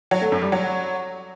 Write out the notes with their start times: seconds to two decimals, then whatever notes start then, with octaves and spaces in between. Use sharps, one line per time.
0.11 F#3
0.22 A3
0.32 F#2
0.42 G3
0.52 F#3